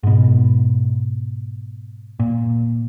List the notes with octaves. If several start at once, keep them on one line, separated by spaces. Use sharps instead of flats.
G#2 B2
A#2